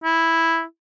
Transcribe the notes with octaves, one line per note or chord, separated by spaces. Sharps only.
E4